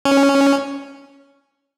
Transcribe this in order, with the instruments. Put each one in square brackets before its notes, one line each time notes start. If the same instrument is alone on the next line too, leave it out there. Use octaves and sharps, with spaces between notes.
[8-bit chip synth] C#4